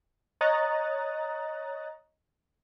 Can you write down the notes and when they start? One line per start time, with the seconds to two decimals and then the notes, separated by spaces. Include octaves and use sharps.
0.41 C#5 D#5 A#5 D#6 F#6 A6